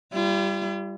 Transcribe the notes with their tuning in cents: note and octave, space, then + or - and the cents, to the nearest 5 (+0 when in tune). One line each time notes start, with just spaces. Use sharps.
G3 +0 F4 -45